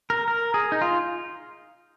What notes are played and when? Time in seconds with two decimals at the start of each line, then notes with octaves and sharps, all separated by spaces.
0.10 A#4
0.28 A#4
0.54 G#4
0.72 D#4
0.81 F4